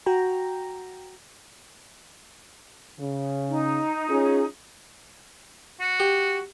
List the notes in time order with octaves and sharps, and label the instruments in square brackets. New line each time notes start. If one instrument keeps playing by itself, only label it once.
[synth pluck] F#4 G5 A#5
[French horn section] C#3
[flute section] D#4
[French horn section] C#4 F4 G#4
[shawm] F#4
[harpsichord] G4